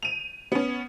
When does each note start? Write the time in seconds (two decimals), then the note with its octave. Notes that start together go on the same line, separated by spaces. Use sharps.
0.03 D#7 F7
0.52 B3 C#4